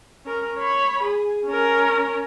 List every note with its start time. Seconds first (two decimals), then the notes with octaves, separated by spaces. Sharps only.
0.25 C#4 A#4
0.59 C#5 B5
1.04 G#4
1.46 C#4 A#4